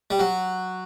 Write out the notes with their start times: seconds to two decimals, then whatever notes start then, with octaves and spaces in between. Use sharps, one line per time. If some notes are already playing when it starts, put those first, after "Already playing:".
0.10 G3
0.19 F#3